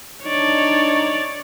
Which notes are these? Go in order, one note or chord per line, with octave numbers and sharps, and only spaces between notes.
D4 D#4 C#5 D5